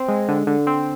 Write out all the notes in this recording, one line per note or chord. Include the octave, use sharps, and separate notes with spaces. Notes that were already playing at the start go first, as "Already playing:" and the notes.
Already playing: C4
G#3
D3
D3
C4